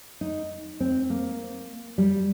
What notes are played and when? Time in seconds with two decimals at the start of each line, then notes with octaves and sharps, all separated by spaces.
0.21 D#4
0.80 C4
1.10 A#3
1.98 G3